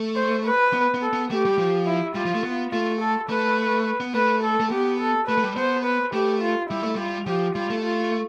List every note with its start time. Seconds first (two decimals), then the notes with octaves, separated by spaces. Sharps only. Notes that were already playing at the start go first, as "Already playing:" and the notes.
Already playing: A3
0.16 C5
0.45 B4
0.73 B3
0.94 B3
1.02 A4
1.13 B3
1.31 A3 G4
1.45 G3
1.58 F3
1.87 E4
2.15 G3 F4
2.25 F3
2.34 A3
2.44 B3
2.72 A3 F4
3.01 A4
3.30 A3 B4
4.00 B3
4.14 A3 B4
4.43 A4
4.60 A3
4.71 B3 G4
5.00 A4
5.28 A3 B4
5.38 A3
5.43 G3
5.57 B3 C5
5.85 B4
6.13 A3 G4
6.42 F4
6.70 G3 E4
6.83 A3
6.95 G3 F4
7.27 F3 G4
7.56 G3 F4
7.70 A3
7.84 F4